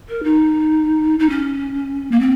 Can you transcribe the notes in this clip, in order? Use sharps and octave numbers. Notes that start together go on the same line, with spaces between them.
A#4
D#4
D#4
C#4
A#3
C4